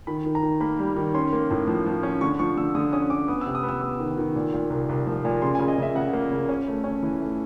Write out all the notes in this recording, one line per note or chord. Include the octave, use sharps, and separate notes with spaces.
D#3 B5
D#3
A#5
D#3
A#3 B5
G3
D#3
C#4 C6
A#3
A2
F3
F3
C#4
D3 C#6
F3 C#6
D3 E6
D3 D#6
C#4 D#6
C#4 D6
B3 D#6
E6
C3
D#6
B3
E6
B3 D#6
D#3
D#3
A#2
A#2
C2
C2
F3
A#2
C#3 C6
G#5
C#3
D#5
C#3 E5
C#3 F#5
A#3
C#3
C#4
A3
C#4
E3
A3